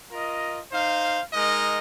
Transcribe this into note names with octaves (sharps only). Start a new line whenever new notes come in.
F4 A#4 D#5
D#4 C5 F5
G#3 D#4 A#4 D#5